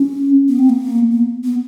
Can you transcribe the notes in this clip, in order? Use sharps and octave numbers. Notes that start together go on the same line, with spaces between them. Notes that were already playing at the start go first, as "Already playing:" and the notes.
Already playing: C#4
B3
C4
A#3
B3
B3